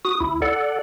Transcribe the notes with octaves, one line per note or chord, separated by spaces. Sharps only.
F#4 D#6
D2 E4
A4 D5 F#5